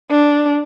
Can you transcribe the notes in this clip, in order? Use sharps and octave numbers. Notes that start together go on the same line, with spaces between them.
D4